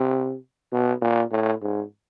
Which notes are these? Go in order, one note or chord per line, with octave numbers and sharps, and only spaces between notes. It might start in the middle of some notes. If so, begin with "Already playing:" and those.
Already playing: C3
B2
A#2
A2
G#2